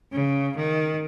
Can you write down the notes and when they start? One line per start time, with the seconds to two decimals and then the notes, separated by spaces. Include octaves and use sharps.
0.12 C#3
0.56 D#3